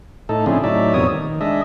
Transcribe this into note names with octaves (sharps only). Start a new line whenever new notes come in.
A2 D#4 A4
C#3 F3 C4 D4 E4 G#4
A2 F#3 D#4 D5 E5
F2 B2 G3 A#3 C#5 D#6
D#3
G#3 D4 D#5 E5